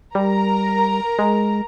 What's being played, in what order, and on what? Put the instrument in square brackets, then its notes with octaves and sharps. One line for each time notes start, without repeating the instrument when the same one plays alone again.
[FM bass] G3 [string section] A#4 A#5
[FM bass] G#3